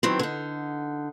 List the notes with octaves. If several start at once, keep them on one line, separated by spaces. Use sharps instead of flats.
D#3 E3 F#3 B3 C4
D3 D#4